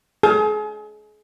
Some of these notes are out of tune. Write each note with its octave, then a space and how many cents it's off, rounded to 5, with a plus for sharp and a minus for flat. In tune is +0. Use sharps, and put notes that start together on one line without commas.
G#4 +35